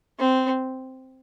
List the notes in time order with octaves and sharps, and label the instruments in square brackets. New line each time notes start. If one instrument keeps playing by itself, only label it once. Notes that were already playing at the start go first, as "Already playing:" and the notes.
[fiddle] C4